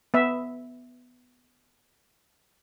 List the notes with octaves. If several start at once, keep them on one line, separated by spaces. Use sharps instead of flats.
B3 E5